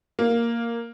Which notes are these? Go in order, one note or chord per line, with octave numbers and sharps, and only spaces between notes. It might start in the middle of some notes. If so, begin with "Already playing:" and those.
A#3